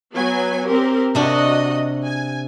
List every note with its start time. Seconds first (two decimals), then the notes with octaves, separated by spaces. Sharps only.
0.12 F#3 B3 G#5
0.66 C4 G4 A#4
1.15 C3 D4 F#4 D#5
2.04 G#5